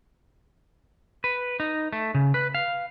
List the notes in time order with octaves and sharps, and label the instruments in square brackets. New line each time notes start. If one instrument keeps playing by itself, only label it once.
[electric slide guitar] B4
D#4
A3
C#3
B4
F5